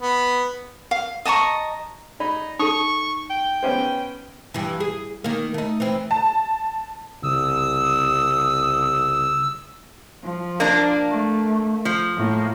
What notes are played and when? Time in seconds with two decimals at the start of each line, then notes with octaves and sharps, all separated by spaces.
0.01 B3
0.91 F5
1.25 D#5 A5 A#5 C#6
2.20 D#4 D5 B5
2.59 D#4 A4 C#6 D#6
3.30 G5
3.63 B3 C#4 C5
4.54 G2 E3
4.80 G#4
5.24 D#3 A#3
5.54 A3 D#4
5.80 E3 C4
6.11 A5
7.23 C2 C#3 D#6 E6
10.24 F3
10.60 A#3 D4
11.10 A3
11.85 F3
12.16 A2 A#3